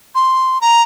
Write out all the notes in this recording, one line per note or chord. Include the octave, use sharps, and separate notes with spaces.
C6
A#5